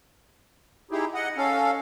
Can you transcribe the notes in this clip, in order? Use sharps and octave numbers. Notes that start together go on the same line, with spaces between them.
D#4 E4 G4 G#4
D#5 F#5
C#4 A4 F5